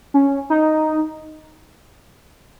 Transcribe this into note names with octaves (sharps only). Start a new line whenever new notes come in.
C#4
D#4